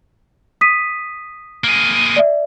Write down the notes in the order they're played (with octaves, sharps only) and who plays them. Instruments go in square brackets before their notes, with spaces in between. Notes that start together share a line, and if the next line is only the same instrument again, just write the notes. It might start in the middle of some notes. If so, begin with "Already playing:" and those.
[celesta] D#6 B6 D#7
[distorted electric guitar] A#3 G#4
[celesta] D#7
D5 E5